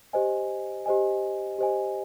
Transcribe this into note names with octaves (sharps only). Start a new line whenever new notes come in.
G4 C5 D#5 G#5
G4 C5 D#5 G#5
G4 C5 D#5 G#5